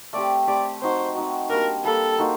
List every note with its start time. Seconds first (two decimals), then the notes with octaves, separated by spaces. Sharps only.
0.13 A3 C4 G4 D5
0.47 A3 C4 G4 D5
0.81 C4 D#4 F#4 C5
1.15 C4 D#4 F#4
1.50 G3 A#3 D4 A#4
1.84 G3 A#3 D4 A4
2.18 A#3 D#4 F#4 C5